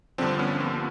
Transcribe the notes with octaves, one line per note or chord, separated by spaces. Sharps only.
G2 D3 F3 C4 D4
B3 C#4
A#3 C4